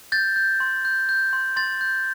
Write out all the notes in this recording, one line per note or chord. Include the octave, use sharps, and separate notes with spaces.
G6 A6
G6
C6
G6
G6
C6
C6 A6
G6